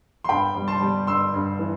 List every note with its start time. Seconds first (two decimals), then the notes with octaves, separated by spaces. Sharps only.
0.24 C6
0.29 G2 G5 B5
0.55 G3
0.68 A5 C6
0.81 G3
1.07 G2 C6 E6
1.34 G2
1.59 E3